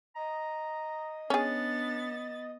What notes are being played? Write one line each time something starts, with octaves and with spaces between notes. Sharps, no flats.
D#5 A#5
B3 C#4 D4 G#4 A6